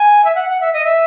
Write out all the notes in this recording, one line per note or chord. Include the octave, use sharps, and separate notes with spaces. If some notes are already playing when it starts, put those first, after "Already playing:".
Already playing: G#5
E5
F#5
F#5
E5
D#5
E5